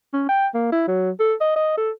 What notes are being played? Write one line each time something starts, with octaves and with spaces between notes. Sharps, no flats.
C#4
G5
A#3
E4
F#3
A4
D#5
D#5
A4